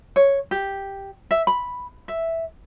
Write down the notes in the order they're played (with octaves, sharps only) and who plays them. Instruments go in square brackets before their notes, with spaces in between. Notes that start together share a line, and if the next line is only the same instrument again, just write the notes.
[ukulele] C#5
G4
E5
B5
E5